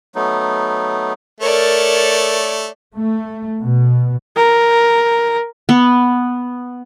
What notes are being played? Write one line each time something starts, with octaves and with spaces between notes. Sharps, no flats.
F#3 A3 B3 D#4
A3 A#4 C#5 D5
A3
B2
A#4
B3